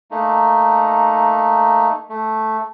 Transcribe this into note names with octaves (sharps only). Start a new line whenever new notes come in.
A3 A#3 D#4
A3